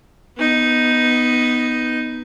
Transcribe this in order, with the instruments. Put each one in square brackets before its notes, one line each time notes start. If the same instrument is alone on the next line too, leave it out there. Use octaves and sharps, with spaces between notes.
[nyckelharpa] B3 D#4